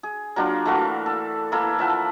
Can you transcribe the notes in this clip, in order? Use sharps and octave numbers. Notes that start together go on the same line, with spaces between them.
G#4
F#3 A#3 D4 F4
E3 A3 A#3 F#4
A4
E3 A#3 E4 A4
F3 E5 F#5